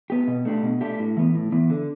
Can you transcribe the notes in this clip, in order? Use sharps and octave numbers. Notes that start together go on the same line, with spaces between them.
B3 G4
B2
A3 D4 G4
B2
A3 D4 G4
A2
E3 B3
A2
E3 B3
D3